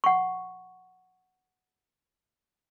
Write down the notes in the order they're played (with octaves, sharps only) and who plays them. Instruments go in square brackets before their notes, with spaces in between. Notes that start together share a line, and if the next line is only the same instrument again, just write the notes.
[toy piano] F#5 C#6